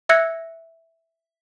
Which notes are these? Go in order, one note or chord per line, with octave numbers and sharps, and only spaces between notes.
E5 E6 F#6 G#6 A#6 C#7